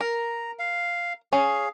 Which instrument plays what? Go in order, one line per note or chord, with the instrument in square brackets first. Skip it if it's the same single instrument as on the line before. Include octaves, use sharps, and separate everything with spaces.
[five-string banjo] A#4 [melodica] A#5
[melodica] F5
[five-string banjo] C#4 [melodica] G#4 F5